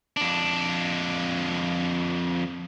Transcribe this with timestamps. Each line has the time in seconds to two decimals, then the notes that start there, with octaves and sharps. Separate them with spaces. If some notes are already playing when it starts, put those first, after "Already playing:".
0.17 F2 D4